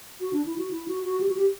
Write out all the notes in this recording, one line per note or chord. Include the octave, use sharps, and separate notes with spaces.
F#4
D4
E4
F#4
E4
F#4
F#4
G4
F#4
G4